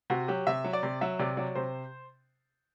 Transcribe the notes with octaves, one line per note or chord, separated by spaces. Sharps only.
C3 F#4
F#3 G4
C3 E5
F#3
D5
C3
F#3 E5
C3 D5
F#3 D5
C3 C5